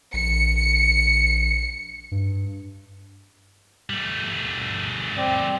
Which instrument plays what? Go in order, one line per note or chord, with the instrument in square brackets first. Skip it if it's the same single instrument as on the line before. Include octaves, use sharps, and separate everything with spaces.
[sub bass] A#1 [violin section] C#7
[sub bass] G2
[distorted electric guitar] G3 A3
[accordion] C4 D5